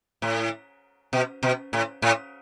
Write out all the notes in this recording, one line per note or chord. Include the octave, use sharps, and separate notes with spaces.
A2
B2
B2
A2
A2